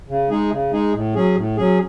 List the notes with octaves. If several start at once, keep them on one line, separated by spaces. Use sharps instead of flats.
C#3
G#3 D#4 G#4
C#3
G#3 D#4 G#4
A2
F#3 C#4 G#4
A2
F#3 C#4 G#4